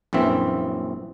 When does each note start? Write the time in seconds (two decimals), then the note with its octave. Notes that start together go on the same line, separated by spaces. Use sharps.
0.13 A#1 F#2 E3 C4 E5